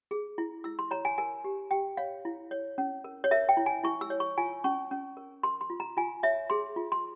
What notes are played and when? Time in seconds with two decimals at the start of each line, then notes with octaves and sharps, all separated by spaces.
0.11 G#4
0.38 E4
0.64 E4 E6
0.79 C6
0.91 C#5 A#5
1.05 G#5
1.18 A#4 G#5
1.44 G4
1.71 G4 G5
1.97 C#5 F5
2.25 E4
2.51 C#5
2.78 C#4
3.04 A#4
3.24 C#5
3.31 A#4 E5
3.49 G5
3.57 E4
3.66 G#5
3.84 E4 C#6
4.01 E6
4.10 C#5
4.20 C#6
4.38 F4 G#5
4.64 C#4 C#6
4.91 C#4
5.17 A#4
5.43 A#4 C6
5.61 C6
5.70 F4
5.80 A#5
5.97 F4 G#5
6.23 C#5 E5
6.50 G#4 C6
6.76 F4
6.92 C6